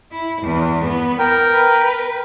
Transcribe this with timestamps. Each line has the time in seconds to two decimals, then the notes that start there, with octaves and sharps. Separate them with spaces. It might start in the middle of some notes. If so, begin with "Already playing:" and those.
0.12 E4
0.42 E2
0.85 B3
1.19 A#4 G5
1.52 B4